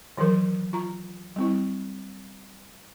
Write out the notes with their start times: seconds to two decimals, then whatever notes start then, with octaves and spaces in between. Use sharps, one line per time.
0.17 D#3 E3 F#3 A#4
0.73 F4 A#5
1.36 G3 C4 E4